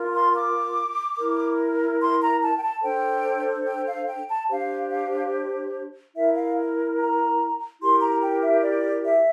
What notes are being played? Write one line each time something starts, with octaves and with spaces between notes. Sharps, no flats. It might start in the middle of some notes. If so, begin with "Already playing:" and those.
Already playing: F4 A#4
C6
D6
E4 A#4
C6
A#5
A5
G5
A5
D4 A4 C5 G5
G5
F5
G5
A5
D4 G4 C5 F5
F5
E4 A#4 E5
F5
A#5
E4 G4 A#4 C6
A#5
G5
E5
D5
E5